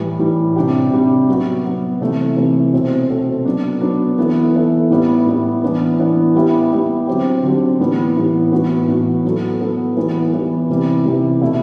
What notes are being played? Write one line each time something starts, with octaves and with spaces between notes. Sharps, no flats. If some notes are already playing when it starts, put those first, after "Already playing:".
Already playing: A2 E3 G3
A2 E3 G3
C3 G3 D4 G4
C3 G3 D4 G4
F#3 B3 F#4
F#3 B3 F#4
C3 E3 A3
C3 E3 A3
B2 A3 C4 F#4 A4
B2 A3 C4 F#4 A4
F#3 B3 D4
F#3 B3 D4
E3 B3 E4 A4
E3 B3 E4 A4
A2 G3 B3 E4
A2 G3 B3 E4
E3 B3 D4
E3 B3 D4
G3 B3 E4 G4
G3 B3 E4 G4
D3 F#3 C4 G4
D3 F#3 C4 G4
A2 E3 G3 B3
A2 E3 G3 B3
A2 E3 B3 F#4
A2 E3 B3 F#4
F#3 B3 F#4 A4
F#3 B3 F#4 A4
E3 G3 B3
E3 G3 B3
C3 E3 G3
C3 E3 G3
B2 A3 E4